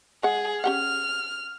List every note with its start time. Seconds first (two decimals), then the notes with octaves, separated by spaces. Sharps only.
0.23 G#3 G#4 F#5
0.64 C#4 G4 F#5 F6